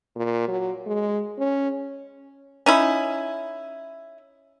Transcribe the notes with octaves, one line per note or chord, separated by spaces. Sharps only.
A#2
F#3
G#3
C#4
C#4 D#4 E4